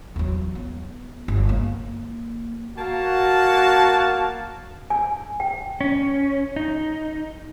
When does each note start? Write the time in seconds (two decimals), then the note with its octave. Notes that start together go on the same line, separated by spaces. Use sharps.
0.16 E2 F#3
0.55 B3
1.28 G1
1.49 A#3
2.78 A#3 F#4 F5 A5
4.90 G#5
5.40 G5
5.81 C#4
6.56 D#4